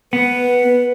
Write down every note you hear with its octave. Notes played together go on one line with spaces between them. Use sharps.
B3 B4